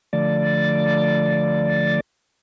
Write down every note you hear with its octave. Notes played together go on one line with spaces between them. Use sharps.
D3 F3 A3 D5 A6